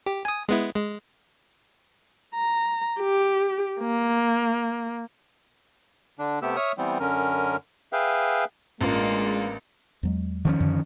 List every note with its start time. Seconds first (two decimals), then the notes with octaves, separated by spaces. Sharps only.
0.06 G4
0.25 G#5 D#6
0.49 G#3 B3 E4
0.76 G#3
2.34 A#5
3.00 G4
3.81 A#3
6.19 D3 D4
6.42 C3 A3 B3 G4 E6
6.56 C#5 E5 C#6 D#6 F6
6.78 E3 G3 B3 C4
7.00 F#2 D3 C#4 A#4
7.93 G#4 B4 E5 F5 G5
8.81 A1 G#3 A#3 D4 F4
10.03 E2 F#3 G#3
10.45 D#3 F3 C#4
10.60 F#2 D3